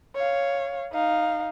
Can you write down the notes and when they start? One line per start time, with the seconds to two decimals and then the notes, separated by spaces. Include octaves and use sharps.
0.15 C#5 F5
0.93 D#4 F5